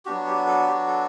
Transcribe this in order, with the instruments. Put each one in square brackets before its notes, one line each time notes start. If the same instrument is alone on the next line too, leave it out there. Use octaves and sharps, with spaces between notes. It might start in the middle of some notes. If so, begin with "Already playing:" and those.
[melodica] F#3 B3 D4 F#4 G4
G4
A4
G4
A4